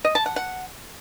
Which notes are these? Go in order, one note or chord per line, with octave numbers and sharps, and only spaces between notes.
D#5
A5
F#5
F#5